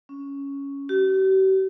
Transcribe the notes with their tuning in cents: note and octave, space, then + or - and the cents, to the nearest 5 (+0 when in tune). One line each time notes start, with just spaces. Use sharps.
C#4 +5
G4 -45